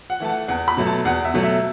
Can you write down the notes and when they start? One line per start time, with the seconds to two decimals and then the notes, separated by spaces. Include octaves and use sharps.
0.10 F#5
0.20 E3 A3 A5
0.29 F#5
0.48 E2 F#5
0.68 B5
0.77 B2 F#3 A3
0.87 A5
1.05 E2 F#5
1.25 E5
1.34 B2 F#3 A3
1.43 E5